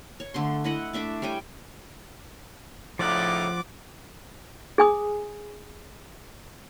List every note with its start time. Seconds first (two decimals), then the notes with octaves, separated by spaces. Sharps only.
0.20 C#5
0.34 D3 A3 C6
0.64 E4 D#5 F#5
0.93 A3 D4 E5 D6
1.22 G3 C#5 G5 G#5
2.99 A2 C#3 F3 D#4 D5 F#5 D6
4.78 G#4 G#5 D#6